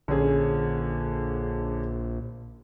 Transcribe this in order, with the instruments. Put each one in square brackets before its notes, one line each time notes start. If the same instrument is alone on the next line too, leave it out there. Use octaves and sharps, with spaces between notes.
[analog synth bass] A#1 [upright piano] D3 C#4 G#4